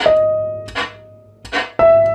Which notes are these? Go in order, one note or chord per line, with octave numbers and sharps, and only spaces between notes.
D#5
E5